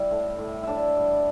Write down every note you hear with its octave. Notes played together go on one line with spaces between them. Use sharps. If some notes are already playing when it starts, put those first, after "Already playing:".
Already playing: G3 E4
A2
A2
A2 D4 E4
G3